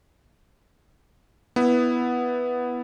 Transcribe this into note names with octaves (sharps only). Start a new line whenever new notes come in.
B3 E4